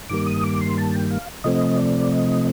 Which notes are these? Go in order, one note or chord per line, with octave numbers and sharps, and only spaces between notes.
G2 D#3 G3 A#3 D6
D#6
D6
C6
A5
G5
F5
C3 F3 A3 C4 D#5
D5
D#5